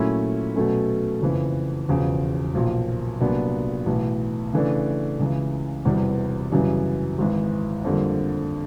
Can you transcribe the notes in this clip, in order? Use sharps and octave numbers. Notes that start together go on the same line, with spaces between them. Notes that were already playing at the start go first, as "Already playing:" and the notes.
Already playing: A#2 F#3 A3 C#4 E4
B2 F#3 A3 C#4
F#1 F2 C#3 E3
E1 E2 C#3 F3
B1 A#2 F3 A#3
C2 A#2 F#3 B3 D4
B1 A2 E3
C#3 E3 A3 D4
C#2 C#3 E3
E1 E2 C3 E3 G3
F#2 C#3 E3 G3
G#1 G#2 E3
F2 D3 G3 A#3